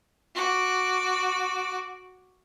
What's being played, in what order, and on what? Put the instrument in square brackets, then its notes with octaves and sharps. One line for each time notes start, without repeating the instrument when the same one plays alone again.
[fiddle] F#4 D6